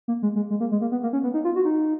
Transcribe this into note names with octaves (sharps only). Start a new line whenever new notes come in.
A#3
G#3
G#3
G#3
A#3
G#3
A#3
B3
A#3
C#4
B3
D#4
F4
F#4
D#4